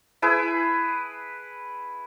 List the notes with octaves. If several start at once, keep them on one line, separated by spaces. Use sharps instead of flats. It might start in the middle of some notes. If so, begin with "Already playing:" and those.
E4 G#4 B4